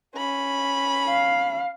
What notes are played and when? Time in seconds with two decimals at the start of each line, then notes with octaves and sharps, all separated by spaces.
0.16 C#4 B5
1.08 F5